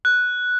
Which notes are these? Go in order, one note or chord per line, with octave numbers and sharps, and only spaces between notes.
F#6